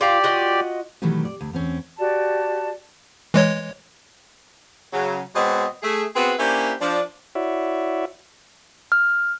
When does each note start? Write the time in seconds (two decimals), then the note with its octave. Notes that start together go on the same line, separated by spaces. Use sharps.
0.01 F4 G4 D5 F5 A#5
0.24 F4 F#4 D#5
1.02 B2 D#3 E3 F#3 A3 G4
1.25 D5
1.41 D2
1.53 E2 C4 C#4
1.98 F#4 G4 D5 A5
3.34 E3 G#3 C#5
4.93 C#3 F#3
5.36 B2 G#3 B3 C4 C#5 D#5
5.83 A3 G#4
6.16 B3 C4 F#4 G#4 B4
6.39 A#3 C#4 D4 E4 G4 C5
6.81 F3 D4
7.35 E4 F#4 C#5 D5 E5
8.92 F6